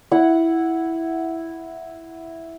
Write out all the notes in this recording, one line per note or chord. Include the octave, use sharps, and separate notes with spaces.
E4 F#5